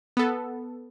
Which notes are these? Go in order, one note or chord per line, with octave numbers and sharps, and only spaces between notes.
B3 A4